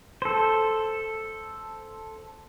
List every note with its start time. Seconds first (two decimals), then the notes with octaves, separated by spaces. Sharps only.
0.22 A4 C5